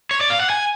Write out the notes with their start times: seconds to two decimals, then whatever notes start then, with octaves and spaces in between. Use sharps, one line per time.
0.11 C#5
0.21 D5
0.30 F5
0.40 F#5
0.50 G#5